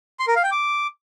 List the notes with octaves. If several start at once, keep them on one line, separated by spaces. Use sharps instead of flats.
C6
A#4
F5
G5
D6